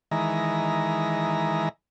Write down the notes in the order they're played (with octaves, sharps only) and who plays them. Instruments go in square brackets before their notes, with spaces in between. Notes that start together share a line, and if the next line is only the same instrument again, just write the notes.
[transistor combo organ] D#3 E3 G#3 A#5